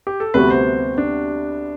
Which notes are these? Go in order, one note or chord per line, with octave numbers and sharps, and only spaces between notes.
G4
A4
D2 C3 G3 B3 F#4 B4
C5
D4